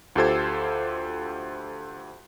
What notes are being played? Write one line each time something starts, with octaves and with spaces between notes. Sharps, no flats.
D2 F4 G4 A4 C5 G#6